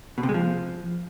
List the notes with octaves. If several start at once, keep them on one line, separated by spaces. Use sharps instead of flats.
B2
C3
G#3
F3